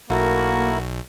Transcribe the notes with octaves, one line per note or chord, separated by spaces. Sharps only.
B1 A3 A#3 E4 F#4 A#4